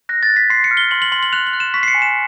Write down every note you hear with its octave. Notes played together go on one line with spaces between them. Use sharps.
F#6 A#6
A6
F#6
B6
C6 C7
C#7
F6
G7
C6 F#7
F#7
C6 F#7
F#7
F#6 F7
F#7
F#6
E7
C#6 B6
C7
C#7
G#5
E7